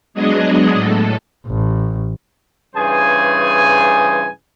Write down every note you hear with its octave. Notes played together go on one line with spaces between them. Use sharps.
F#3 G#3 B3 D4 G#4 D#5
A2 A4
A1
G2 C#3 E3 G#4 C5 G#5